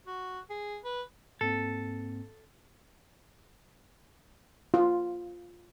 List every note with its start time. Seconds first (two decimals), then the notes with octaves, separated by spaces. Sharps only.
0.07 F#4
0.50 G#4
0.84 B4
1.41 G#2 A#3 C4 A4
4.74 F4